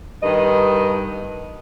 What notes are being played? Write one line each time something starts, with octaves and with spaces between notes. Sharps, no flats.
G2 D#3 D#5